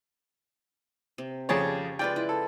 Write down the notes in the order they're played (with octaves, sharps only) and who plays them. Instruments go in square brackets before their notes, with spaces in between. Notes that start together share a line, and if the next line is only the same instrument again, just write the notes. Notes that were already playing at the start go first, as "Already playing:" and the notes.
[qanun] C3
[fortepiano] F2 G#4 C#5 [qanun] C#3 G4 A5
[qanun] G#3 F4 B4 [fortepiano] D5 G5
[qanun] E4
[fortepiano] A4